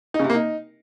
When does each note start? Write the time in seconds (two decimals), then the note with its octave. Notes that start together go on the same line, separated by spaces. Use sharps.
0.14 D#4
0.19 C#3
0.25 C3
0.30 A#3
0.35 D#4